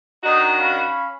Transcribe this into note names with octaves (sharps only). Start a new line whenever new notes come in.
D#3 D4 D#4 F#4
C#4 F5 B5